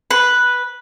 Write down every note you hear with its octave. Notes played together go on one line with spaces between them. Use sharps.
B4